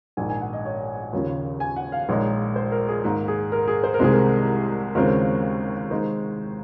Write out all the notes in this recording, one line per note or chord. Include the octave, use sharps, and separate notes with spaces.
A#1 G#2 D#3 G#5
G#5
F#5
D#5
C#5
D#2 C#3 F3
G#5
F#5
F5
A#1 A#2 G#3 D#4 C#5
C5
A#4
G#4
G#2 D#3 A#3
G#4
A#4
G#4
C5
A#4
C2 C3 D#3 G#3 C4 G#4
A#4
D#2 C#3 G#3 C4 F4 A#4
D#3 G#3 D#4 C5